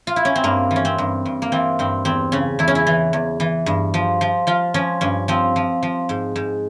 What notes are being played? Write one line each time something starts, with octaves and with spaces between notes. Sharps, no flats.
F4
E4
C#4
C4
G2 A#3
E3
C#4
C4
G2
G2
A#3
E3 C4
G2 C4
E2 C4
C#3 C#4
E2 E4
C#4
E4
E3
E2
E3
G2
F3
F3
F3 F4
F3 C#4
G2 C#4
F3 C4
F3
F3
G#2
G#2